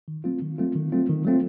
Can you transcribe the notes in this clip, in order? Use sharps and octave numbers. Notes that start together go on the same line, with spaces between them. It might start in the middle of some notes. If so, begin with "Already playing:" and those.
D#3
F#3 A3 C4 F4
D#3
F#3 A3 C4 F4
D#3
F#3 A3 C4 F4
D#3
F#3 A3 C4 F4